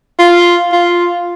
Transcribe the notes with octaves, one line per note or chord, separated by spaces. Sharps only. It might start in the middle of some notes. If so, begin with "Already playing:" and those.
F4
F4